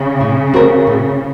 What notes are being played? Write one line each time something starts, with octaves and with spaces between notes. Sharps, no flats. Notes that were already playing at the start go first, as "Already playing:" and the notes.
Already playing: C#3
A2
A3 C4 F#4 A#4
A2